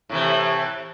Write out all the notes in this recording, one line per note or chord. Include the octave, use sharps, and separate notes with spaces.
A2 C3 E3